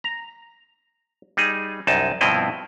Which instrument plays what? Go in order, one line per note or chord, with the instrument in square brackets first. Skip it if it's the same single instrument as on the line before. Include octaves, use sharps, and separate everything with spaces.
[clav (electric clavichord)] A#5
G3 D#4 G#4
C2 F#2 D#4 A5
G2 B2 F3 C4 E4 D#5